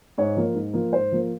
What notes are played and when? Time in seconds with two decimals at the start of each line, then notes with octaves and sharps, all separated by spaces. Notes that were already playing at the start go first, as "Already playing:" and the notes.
0.18 G#2 C#5
0.36 F3 A#3
0.55 G#2
0.73 F3 A#3
0.93 G#2 C5
1.12 F3 A#3